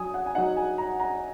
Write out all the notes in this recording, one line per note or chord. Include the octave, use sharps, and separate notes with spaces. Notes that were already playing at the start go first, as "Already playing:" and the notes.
Already playing: F#3 G#5 D#6
F#5
G#5
F#3 D#4 F#5
G#5
A#5
A#5